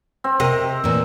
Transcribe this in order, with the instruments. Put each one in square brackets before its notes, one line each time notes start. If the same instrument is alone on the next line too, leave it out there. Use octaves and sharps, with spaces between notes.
[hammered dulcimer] C4
[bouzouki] C3 [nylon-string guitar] A#4 D#5
[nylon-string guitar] A#2 E3